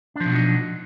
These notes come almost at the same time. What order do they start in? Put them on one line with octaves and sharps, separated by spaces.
D4 F3 B2 F#3 D#4